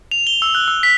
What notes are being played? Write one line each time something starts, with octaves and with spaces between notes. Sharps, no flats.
F7
G7
E6
F#6
E6
B6